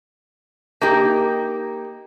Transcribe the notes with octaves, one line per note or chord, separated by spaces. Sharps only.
A#3 D#4 G4